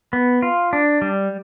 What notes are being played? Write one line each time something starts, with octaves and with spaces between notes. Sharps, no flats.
B3
F4
D4
G3